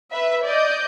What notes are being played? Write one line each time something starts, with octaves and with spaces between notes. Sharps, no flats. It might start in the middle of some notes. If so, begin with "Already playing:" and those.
B4 E5
D5 D#5 G6